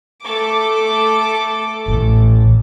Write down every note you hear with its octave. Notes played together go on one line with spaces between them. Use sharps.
A3 A4 D6
A1 A2